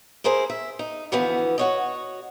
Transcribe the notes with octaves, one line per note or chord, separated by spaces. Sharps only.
E4 G#4 A#4 C5
E5
D#4
D2 E3 F3 B3
F#4 C#5 D#5